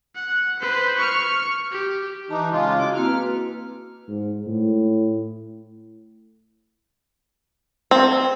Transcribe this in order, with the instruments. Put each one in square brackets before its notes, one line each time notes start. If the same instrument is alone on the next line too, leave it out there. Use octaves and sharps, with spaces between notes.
[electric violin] F#5
B4 C5
C#6 F6
G4
[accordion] E3 D#4 [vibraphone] A5 D6
[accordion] C#3 G#3 F4
[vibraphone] E4 F#4 G#4 [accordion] D6
[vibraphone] A#3 C4 F#4 [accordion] F6
[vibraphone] B4
[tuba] G#2
A2
[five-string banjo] C4